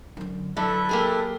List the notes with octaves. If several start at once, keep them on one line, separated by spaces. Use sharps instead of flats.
F#2 D3
D3 F#3 E4 A4 B4 E5
A#3 G4 G#4